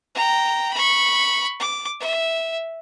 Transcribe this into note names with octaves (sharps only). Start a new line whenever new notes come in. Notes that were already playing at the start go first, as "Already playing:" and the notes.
G5 A#5
B5 C#6
D6
E5